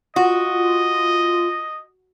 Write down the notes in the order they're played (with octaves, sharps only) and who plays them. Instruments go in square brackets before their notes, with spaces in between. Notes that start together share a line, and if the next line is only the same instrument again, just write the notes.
[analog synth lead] F4 [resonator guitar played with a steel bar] F#4 [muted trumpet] D#5